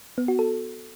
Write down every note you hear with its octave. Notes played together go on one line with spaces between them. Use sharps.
B3
F#4
A4